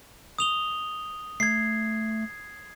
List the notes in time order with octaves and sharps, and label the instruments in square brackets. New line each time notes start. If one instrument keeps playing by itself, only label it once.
[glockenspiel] D#6 F7 G7
[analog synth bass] A3 [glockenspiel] G#6 C7